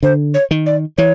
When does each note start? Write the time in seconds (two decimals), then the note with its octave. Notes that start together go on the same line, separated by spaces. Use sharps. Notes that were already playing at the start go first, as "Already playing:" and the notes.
0.03 D3 C5
0.34 C#5
0.51 D#3
0.66 D5
0.98 E3 C#5